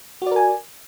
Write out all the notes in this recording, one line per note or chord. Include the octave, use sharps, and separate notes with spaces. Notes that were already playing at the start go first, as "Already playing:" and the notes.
F#4 A#4 D5 G#5